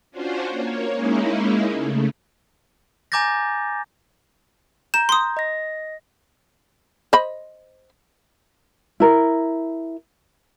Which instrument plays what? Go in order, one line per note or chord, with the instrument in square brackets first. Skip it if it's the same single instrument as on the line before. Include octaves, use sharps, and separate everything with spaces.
[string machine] C#4 D4 F4 F#4 C5
A#3 C#5
G#3 A#3 C#4 D#4 E4
C#3 A3
[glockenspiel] G#5 A#5 D6 G6 A6 A#6
[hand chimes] A#5 G6 [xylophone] E7
[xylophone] C6 D#6
[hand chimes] D#5 A#6
[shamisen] C5 D#5 B5
[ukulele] E4 A#4